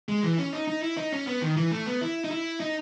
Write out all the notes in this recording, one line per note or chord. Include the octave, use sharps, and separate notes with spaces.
G#3
E3
C#4
D#4
D#4
E4
D#4
C#4
B3
D#3
E3
A3
B3
E4
D#4
E4
D#4